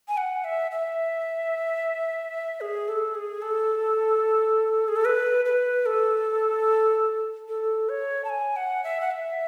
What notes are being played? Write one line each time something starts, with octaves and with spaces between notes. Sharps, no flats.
G#5
F#5
E5
E5
G#4
A4
G#4
A4
G#4
A4
B4
B4
A4
A4
C#5
A5
G#5
F#5
E5
F#5
E5